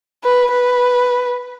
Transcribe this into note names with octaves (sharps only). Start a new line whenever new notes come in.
B4
B4